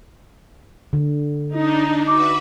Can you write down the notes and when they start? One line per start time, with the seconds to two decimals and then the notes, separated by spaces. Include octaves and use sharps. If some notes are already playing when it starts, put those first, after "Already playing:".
0.93 D3
1.55 D4 D#4
2.07 F#4 B4 E5 D6